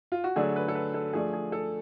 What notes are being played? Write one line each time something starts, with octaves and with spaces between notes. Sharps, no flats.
F4
F#4
D3 F#3 A3 D4 G#4
B4
A4
B4
A4
F3 A3 D4 G#4
G#4
A4